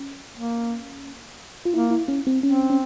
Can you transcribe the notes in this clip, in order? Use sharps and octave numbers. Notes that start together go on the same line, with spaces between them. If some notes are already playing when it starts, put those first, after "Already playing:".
Already playing: C#4
A#3
F4
A#3 E4
E4
C#4
C4
C4 C#4
C#4